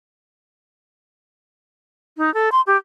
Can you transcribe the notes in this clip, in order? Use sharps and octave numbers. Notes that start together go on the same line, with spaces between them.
D#4
A4
C6
G4